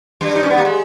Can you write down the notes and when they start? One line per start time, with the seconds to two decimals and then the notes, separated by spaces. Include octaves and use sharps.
0.21 G2 G3
0.35 D#4
0.43 C#4
0.50 B3
0.58 A#3
0.65 G#3